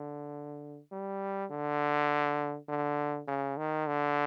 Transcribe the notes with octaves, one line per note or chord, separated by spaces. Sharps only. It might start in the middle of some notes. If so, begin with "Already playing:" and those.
Already playing: D3
G3
D3
D3
C#3
D#3
D3